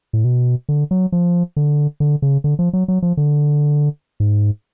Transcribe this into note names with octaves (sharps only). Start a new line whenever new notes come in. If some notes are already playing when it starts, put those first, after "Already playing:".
A2
B2
D3
F#3
F3
D3
D3
C#3
D3
F3
F#3
F#3
F3
D3
G#2